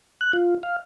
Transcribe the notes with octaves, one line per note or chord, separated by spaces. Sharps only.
F#6
F4
F5